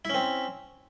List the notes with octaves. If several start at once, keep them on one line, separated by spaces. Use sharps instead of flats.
C4 C#4 E4